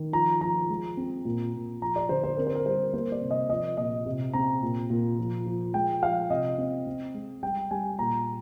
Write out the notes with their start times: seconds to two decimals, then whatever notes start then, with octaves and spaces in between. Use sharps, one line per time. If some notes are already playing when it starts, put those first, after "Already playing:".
Already playing: D#3
0.13 F3 A#5
0.41 F3 A#5
0.69 G#3
0.97 C4
1.25 A#2
1.54 A#2
1.82 F3 A#5
1.96 D5
2.09 D3 C5
2.24 C5
2.37 C4 A#4
2.47 C5
2.55 A#4
2.65 G3 C5
2.94 A#3 C5
3.12 D5
3.21 C3
3.31 D#5
3.50 F3 D#5
3.77 A#2 D#5
4.06 C3
4.33 C4 A#5
4.62 A#2
4.90 A#2
5.19 F3
5.46 F3
5.74 G#3 G5
6.02 F3 F5
6.30 C3 D#5
6.58 C4
6.87 C4
7.14 G#3
7.43 G3 G5
7.71 G3 G#5
7.99 A#2 A#5